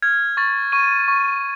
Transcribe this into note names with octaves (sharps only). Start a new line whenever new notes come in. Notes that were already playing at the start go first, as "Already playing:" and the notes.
F6 G#6
C#6 A6
C#6 D#7
C#6